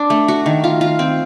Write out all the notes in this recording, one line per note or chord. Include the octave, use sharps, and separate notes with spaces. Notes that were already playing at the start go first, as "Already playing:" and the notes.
Already playing: D4
A3
F#4
D#3
F4
F4
C4